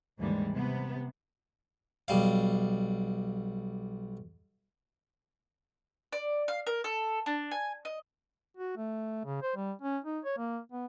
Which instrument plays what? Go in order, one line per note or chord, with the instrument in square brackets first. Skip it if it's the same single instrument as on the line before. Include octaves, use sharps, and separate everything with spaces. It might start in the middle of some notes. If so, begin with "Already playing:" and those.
[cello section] D#2 G#2 D3 E3 G3 G#3
C3 B3
[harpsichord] B1 G3 F5
[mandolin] D5
F5
A#4
A4
D4
G#5
D#5
[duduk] F#4
A3
C#3
C5
G3
C#4
D#4
C#5
A#3
B3